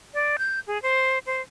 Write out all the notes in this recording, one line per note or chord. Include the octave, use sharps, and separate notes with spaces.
D5
G6
G#4
C5
C5